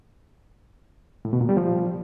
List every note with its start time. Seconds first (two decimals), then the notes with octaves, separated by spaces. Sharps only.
1.25 A2
1.33 B2
1.41 A#2
1.49 G3
1.57 F3